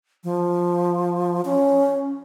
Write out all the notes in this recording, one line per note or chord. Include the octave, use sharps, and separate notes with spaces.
F3
C#4